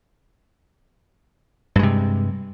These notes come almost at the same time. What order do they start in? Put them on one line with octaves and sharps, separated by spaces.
G2 G#3 C3